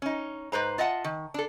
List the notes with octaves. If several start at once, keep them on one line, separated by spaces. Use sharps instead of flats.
C#4 D#4
G#2 B4 C5 A#5
F4 D#5 E5 F#5 A5
D#3
D4 A4